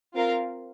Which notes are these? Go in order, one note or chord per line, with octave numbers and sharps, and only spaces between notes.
C4 F4 A#4 F5